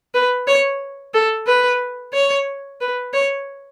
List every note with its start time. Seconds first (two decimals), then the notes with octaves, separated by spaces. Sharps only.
0.14 B4
0.47 C#5
1.14 A4
1.47 B4
2.13 C#5
2.81 B4
3.14 C#5